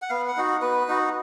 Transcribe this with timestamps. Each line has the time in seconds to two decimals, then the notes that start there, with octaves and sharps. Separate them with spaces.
0.02 F#5
0.10 B3 F5
0.28 F#5
0.37 D#4 F#4
0.62 B3 B4
0.88 D#4 F#4